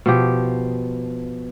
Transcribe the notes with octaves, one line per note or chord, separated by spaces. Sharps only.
B2 F3 G4